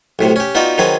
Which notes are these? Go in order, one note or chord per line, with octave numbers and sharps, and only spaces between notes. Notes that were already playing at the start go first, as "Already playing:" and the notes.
B1 A2 C3
C#4 G4
B3 D#4 F4 F#4 D5 G5
D#3 F#3 C4 G#4 B4